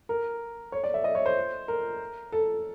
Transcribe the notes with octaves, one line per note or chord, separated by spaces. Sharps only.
A#4
C#5
D5
E5
D#5
C#5
C5
A#4
A4